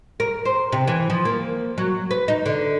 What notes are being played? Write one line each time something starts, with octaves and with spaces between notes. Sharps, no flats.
A#4
C5
C3
E3
F3
A#3
F#3
B4
D#4
D3